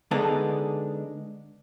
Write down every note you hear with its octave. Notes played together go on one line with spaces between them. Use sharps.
D3 G#3 B3 D4 D#4 A4